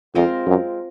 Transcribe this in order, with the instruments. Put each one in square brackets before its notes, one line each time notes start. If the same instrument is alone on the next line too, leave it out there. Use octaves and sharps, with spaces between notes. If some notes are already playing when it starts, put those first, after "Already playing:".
[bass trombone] F2 [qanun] G#3 C4 F4 A#4
[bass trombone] F#2